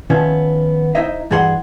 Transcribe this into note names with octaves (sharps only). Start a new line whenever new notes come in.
D#3 F3 B3 C#4 E4
D#4 E4 C5 D#5 E5
G2 E3 F#4 G#4 F#5 C6